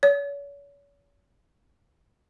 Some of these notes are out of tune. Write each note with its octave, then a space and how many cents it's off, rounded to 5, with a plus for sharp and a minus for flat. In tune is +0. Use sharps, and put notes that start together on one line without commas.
C#5 +40